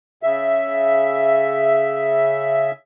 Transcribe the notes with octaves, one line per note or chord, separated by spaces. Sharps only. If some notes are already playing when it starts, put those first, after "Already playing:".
C#3 E5